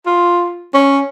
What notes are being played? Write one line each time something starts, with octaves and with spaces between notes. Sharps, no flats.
F4
C#4